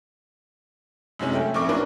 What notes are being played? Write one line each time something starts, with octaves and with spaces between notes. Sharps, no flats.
F#2 C3 G#3 C#4
A3 G5
A#1 A3 C4 C#6 D6
A#3 C#4 D4 A#4 B4